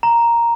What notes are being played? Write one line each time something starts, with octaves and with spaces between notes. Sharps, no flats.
A#5